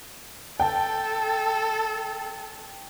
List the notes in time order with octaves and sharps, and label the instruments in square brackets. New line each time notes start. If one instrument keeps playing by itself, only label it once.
[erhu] A4 [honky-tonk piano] G5 A5